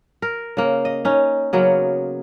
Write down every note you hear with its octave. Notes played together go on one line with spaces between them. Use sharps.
A#4
C#3 A#3
D#5
C#4 D#4
C#3 F#3 A#3 B3